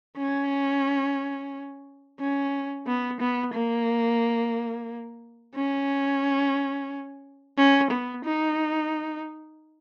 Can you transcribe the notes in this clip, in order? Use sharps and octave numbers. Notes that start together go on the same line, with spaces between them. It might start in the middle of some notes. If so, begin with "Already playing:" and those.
C#4
C#4
B3
B3
A#3
C#4
C#4
B3
D#4